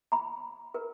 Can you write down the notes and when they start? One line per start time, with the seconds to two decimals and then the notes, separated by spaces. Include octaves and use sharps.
0.12 A#5 B5
0.74 A#4 B4